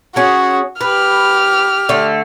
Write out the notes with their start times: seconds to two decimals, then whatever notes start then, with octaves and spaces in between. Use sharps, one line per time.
0.16 C#4 F#4 G#4
0.81 G4 B4 F6
1.89 D3 A3